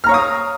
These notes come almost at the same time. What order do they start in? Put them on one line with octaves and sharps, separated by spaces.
F6 A#5 C#5 F5 D#6